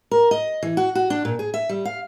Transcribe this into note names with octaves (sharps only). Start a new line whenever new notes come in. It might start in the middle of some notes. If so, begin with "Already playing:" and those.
A#4
D#5
E3
F#4
F#4
D4
A#2
G#4
E5
G3
F5